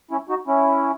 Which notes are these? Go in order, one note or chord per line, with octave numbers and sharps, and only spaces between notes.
C#4 E4
D#4 F#4
C#4 E4